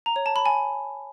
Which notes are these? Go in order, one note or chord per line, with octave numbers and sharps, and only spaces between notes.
A#5
C#5
A5
B5
G#5